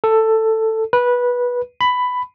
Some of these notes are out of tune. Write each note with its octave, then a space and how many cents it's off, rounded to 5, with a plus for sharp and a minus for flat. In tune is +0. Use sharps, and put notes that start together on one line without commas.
A4 +10
B4 -15
B5 +10